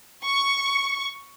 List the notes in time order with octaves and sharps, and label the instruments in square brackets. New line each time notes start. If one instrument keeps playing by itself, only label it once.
[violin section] C#6